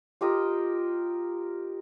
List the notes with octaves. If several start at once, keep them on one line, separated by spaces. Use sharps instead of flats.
F4 G4 A#4 D#5